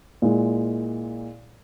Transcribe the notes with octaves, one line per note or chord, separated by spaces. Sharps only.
A#2 G#3 E4 G#4